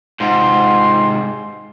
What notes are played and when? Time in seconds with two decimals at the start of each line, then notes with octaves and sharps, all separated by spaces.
0.20 G#2 C3 F4 C5 C6